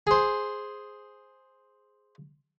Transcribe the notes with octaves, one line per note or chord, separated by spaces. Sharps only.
G#4 C5